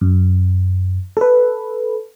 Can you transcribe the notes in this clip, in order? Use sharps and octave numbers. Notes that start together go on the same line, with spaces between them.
F#2
A4 B4